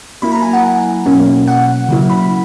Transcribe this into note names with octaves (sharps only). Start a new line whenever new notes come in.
F#3 A#3 E4 B5
A#5
G#5
F#5
B2 F#3 A#3 C#4
F#5
C#3 F#3 A#3 E4
B5